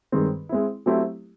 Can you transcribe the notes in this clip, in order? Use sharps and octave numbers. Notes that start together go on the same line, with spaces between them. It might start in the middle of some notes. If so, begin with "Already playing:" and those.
G2 D#3 G#3 C4
G#3 C4 E4
F#3 A3 C4 E4 G4